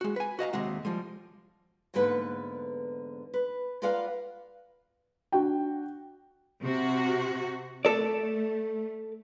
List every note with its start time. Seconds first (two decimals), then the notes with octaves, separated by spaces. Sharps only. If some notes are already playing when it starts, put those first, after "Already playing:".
0.01 G#3 F#4
0.16 B4 G#5
0.39 F#4 D#5 F5 A#5
0.53 D#2 C3 G#3 F#4
0.85 F3 G3 G#3
1.94 E2 G#2 D3 A#3 B4 F#5
3.34 B4
3.82 F4 A#4 B4 D5 F5 F#5
5.32 D4 F#4 G5
6.62 C3 F#4
7.85 A3 A4 D5